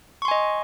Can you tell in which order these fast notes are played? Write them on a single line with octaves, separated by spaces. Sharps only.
C#6 C6 G#5 D#5